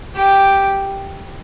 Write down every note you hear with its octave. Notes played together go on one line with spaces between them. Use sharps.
G4